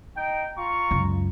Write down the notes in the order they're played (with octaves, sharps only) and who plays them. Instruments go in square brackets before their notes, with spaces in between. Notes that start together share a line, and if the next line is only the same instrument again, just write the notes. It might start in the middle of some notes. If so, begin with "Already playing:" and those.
[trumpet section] D#4 G5
F4 A#5 C#6
[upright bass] C#2 F#2